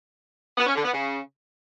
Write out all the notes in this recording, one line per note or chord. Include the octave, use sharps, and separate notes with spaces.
B3
C#4
D3
B3
C#3